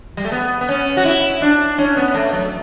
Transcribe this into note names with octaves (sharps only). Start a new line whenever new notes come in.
G3
A3
B3
B3
C#4
F#4
E4
D4
C#4
B3
A3
F#3